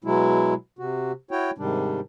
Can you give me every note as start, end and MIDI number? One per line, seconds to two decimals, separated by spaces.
0.04 0.54 47
0.04 0.54 54
0.04 0.54 56
0.04 0.54 64
0.79 1.12 48
0.79 1.12 66
1.31 1.51 64
1.31 1.51 66
1.31 1.51 73
1.31 1.51 79
1.58 2.00 44
1.58 2.00 48
1.58 2.00 51
1.58 2.00 55
1.58 2.00 62